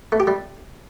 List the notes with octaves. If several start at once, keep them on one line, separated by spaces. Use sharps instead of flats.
A3
G4
G3